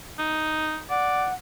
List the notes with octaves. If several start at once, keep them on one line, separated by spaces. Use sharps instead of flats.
D#4
D5 F#5